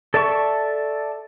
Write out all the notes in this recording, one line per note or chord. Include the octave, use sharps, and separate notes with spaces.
A4 D5 E5 A5 C#6